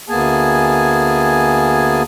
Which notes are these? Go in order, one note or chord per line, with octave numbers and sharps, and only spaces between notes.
D2 A#3 B3 G#4 G#5 A5